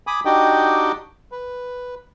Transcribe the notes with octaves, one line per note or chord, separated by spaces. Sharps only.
G#5 B5 D6 D#6
D4 D#4 F#4 G4 D#5 G5
B4